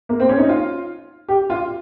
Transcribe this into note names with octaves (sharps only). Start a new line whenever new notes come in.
A#3
C4
C#4
D#4
F4
G4
F4